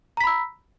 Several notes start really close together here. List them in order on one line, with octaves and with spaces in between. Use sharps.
A#5 B6 B5 E6